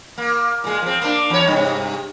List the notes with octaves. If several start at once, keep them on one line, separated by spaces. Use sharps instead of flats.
A#3
A#2 G#3
F3 C4
A#3 D4
E2 C#5
G2 C3